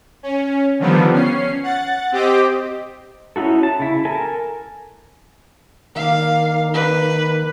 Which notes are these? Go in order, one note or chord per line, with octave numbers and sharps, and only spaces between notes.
C#4
D3 D#3 F3 G3 B3
C#4 C7
F#5 A6
C4 G4 D#5 D6 B6
C#4 D#4 E4 F#4 A4
A5
C#3 E4
A4 A#4 G#5 A5
D#3 A#3 D5 F5
B4